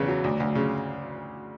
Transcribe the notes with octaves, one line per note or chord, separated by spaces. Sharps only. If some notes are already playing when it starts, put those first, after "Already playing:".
Already playing: E2 C#3 B3
F#3
D2
D2
C#3